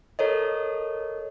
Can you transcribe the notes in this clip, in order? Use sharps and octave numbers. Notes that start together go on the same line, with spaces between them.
A4 A#4 C#5 D#5